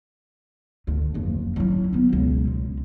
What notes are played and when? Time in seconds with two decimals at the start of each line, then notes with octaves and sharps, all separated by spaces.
0.87 D2
1.14 F#1 F2
1.56 F#3 E4
1.93 B3 D#4
2.12 C#2 B2
2.48 G#3